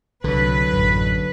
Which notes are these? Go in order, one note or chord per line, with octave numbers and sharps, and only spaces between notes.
C2 D3 F#3 B4
A1 F#2